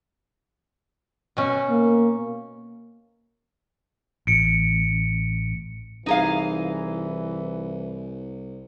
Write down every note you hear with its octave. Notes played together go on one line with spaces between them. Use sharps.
B2 C#4
A#3
A1 C#7 D7
C2 E3 D#4 G#4 F5